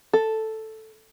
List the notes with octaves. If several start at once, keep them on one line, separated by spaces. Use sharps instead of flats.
A4